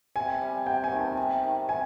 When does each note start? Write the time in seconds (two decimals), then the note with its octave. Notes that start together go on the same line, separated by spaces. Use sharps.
0.16 C3 G#5
0.41 G3
0.66 C3 G5
0.84 G#5
0.92 D#3
1.00 A5
1.17 C3
1.44 D#3
1.68 C3 G#5